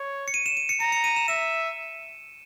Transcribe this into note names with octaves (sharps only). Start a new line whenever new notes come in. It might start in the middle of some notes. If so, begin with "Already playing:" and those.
Already playing: C#5
C#7
D#7
E7
D#7
C#7
A#5 C#7
C#7
D#7
E7
E5 E7